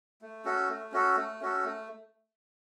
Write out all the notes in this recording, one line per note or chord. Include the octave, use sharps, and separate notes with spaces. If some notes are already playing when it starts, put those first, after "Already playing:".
A3
C#4 F#4 A4
A3
C#4 F#4 A4
A3
C#4 F#4 A4
A3